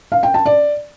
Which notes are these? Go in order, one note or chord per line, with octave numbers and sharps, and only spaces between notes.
F5
G5
A5
D5